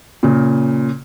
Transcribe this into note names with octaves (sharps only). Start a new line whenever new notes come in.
A#2 C#3